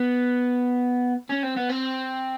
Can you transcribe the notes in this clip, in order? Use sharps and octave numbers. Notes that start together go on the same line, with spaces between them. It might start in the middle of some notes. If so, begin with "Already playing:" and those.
Already playing: B3
C#4
C4
B3
C4